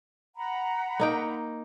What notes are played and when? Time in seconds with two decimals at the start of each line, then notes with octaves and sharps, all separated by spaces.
0.35 F#5 A#5 B5
1.00 A#3 D#4 G5